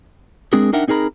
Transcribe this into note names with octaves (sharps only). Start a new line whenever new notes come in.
G#3 C4 D4 G#4 A#4
D4 D#4 A#4 E5 F#5 G5
C4 D#4 G#4 A#4 A#5 B5